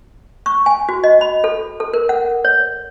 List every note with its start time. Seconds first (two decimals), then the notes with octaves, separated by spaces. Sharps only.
0.46 C#6
0.66 G#5
0.89 F#4
1.04 D#5
1.21 B5
1.44 A4
1.80 A4
1.93 A#4
2.09 F#5
2.45 C#5